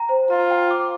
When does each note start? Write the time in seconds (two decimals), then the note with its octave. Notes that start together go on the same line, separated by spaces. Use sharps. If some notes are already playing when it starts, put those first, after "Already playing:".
Already playing: G5 A#5
0.09 C5
0.30 F4 A#5
0.51 G5
0.71 D6